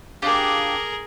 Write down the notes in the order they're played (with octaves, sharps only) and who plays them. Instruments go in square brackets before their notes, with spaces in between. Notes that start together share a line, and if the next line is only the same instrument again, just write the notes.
[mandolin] D4 F4 G4 [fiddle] G#4 A#4